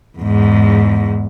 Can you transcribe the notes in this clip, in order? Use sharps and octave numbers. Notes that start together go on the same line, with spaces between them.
E2 G#2